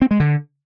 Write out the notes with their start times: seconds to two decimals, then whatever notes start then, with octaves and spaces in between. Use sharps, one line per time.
0.02 C4
0.11 G#3
0.20 D3